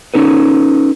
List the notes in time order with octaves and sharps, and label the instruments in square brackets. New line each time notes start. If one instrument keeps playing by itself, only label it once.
[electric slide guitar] C#4 D#4 A4 B4